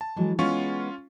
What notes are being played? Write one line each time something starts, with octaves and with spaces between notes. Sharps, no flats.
A5
E3 F#3 G#3
G#3 B3 C#4 F4 C#6